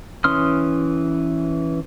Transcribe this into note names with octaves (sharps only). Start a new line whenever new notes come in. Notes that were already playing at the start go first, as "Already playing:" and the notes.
E3 C#4 C6 D#6 F6